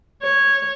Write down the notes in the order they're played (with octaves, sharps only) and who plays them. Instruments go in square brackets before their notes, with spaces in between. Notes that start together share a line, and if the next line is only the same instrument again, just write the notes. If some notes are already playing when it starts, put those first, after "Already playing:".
[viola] C#5